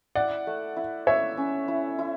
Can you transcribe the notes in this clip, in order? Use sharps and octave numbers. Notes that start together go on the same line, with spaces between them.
E4 D5 F#5
A3
E4
A3 C#5 E5
C#4
E4
E4